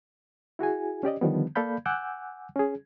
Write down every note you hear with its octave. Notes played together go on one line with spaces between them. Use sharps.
E4 F#4 G#4 G#5
C#4 G4 D5 D#5
D3 D#3 F3 G3 B3
A#3 A4 D5 F5 B5 G6
F#5 G#5 D6 E6 F#6 G6
C#4 G#4